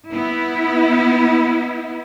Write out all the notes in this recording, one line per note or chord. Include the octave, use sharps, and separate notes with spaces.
B3 E4